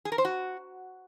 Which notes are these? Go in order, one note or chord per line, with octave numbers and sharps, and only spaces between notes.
G#4
A#4
C5
F#4